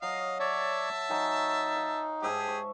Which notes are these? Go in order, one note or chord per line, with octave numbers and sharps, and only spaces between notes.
F#3 D#5 F5
C#5 D5 E5 A5
F#3 D#4 G#5 C#6
F5
G#2 G4 G#4 E5 A5
C#6